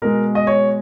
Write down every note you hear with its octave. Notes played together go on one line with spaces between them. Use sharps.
B2 G#3 A#4
D#5
C#5